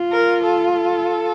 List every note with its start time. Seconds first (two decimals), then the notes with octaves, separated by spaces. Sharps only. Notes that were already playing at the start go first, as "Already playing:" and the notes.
Already playing: F4
0.12 A#4
0.43 A4
0.73 A4